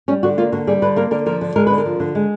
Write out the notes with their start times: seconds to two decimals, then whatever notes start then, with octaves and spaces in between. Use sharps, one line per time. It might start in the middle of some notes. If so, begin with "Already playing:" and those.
0.08 G3 C#4
0.23 D3 F#4
0.38 A#3 F4
0.52 D3 F#4
0.67 G3 G#4
0.82 D3 B4
0.96 A#3 A#4
1.11 D3 A#4
1.26 F3 A#4
1.41 D3
1.56 G#3 A#4
1.67 D3 B4
1.78 A#4
1.86 F3
2.00 D3
2.15 G#3